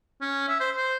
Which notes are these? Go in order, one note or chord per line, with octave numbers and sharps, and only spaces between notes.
C#4
E5
C5
C5